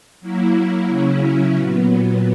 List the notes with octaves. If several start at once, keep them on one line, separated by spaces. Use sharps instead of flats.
F#3 A#3 E4
C#3 F#3 C#4 E4
A#2 F#3 B3